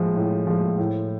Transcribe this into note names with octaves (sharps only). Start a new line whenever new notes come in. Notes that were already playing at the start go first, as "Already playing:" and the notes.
Already playing: A2 F3 G#3
A2
F3 G#3
A2